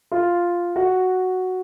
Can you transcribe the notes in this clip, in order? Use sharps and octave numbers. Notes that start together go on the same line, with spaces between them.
F4
F#4